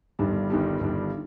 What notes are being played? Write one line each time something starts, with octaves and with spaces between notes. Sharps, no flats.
G1 G2 D#3 G3 D4
G1 G2 D#3 G3 D4
G1 G2 D#3 G3 D4